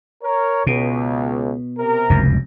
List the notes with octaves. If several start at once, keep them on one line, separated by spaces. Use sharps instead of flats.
A#4 C#5
C#2 B2
C3 A#4
F1 C#2 F#2